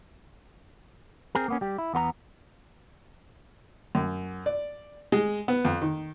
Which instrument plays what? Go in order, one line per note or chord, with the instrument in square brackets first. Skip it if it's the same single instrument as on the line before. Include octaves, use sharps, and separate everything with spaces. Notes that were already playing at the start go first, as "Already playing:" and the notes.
[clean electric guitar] C4 G#4 A#4
A#3 B3 C#4
G3 G4
E4
E2 B3 B4 A#5
[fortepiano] F#2
D5
G#3
B3
F2
D#3